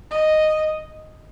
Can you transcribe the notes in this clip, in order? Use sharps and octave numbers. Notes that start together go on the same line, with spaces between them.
D#5